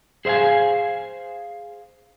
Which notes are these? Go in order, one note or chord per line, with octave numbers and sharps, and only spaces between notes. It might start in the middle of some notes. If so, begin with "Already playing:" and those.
G#4 C5 E5 F5 G#5